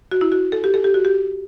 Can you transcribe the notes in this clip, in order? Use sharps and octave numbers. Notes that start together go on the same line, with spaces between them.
F#4
E4
F#4
A4
G4
A4
G4
F#4
G4